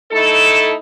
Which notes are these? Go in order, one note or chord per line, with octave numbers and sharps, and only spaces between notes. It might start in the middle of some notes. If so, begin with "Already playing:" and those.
A3 D#4 E4 A4